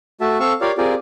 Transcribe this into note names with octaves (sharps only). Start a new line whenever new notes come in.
A3 F#4 E5 A5
C4 A4 F5 C#6 E6
F4 G4 A#4 C#5 D5 F5
C4 F4 G4 G#4 A#4 D5